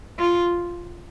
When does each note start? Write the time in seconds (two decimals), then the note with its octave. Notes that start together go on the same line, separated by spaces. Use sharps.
0.19 F4